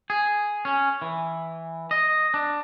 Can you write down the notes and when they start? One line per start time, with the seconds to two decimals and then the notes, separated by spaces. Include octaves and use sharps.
0.10 G#4
0.65 C#4
1.02 E3
1.91 D#5
2.34 D4